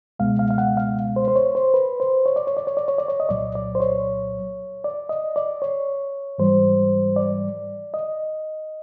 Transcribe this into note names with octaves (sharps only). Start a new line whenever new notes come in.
C#2 B2 G#3 B3 F5
F5
F5
F#5
F5
C5
C5
C#5
C5
B4
C5
C#5
D5
C#5
D5
C#5
D5
C#5
D5
C#5
D#5
C2 A#2 F#3 D5
D5
C5
C#5
D5
D#5
D5
C#5
G#2 E3 G3 C5
D5
D#5